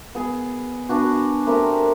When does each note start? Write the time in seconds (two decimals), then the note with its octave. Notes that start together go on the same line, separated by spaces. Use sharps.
0.15 B3 G#4
0.89 B3 D4 F#4
1.46 A3 C4 G4 A#4